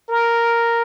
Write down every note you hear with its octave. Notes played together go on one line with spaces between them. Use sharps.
A#4